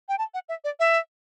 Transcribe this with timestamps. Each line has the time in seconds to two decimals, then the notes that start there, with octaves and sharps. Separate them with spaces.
0.09 G5
0.18 A5
0.34 F#5
0.49 E5
0.64 D5
0.80 E5